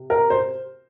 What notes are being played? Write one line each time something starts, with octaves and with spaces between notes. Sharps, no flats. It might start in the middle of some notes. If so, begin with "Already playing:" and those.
Already playing: C3
A#4
C5